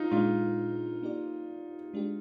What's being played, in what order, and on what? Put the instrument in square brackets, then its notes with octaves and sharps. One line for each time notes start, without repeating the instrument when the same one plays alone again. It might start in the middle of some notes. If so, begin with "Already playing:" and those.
Already playing: [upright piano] D#4 F4
[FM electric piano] A#2 G#3 D4 [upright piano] F4
[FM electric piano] A#3 D#4 G4 D5
G#3 D4 G4